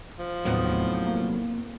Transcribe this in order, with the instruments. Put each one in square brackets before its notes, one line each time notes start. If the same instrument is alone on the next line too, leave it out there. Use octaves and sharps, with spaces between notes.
[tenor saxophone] F3
[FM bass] D#2 [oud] A2 B3 D#4 [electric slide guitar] C3 F#3
[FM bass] A#3